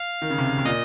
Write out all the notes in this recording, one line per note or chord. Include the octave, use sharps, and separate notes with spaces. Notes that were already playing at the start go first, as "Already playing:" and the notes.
Already playing: F5
D#3
C#3
C3
C#3
C3
A#2 D#5